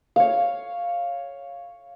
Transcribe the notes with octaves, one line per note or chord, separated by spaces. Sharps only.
C#5 F5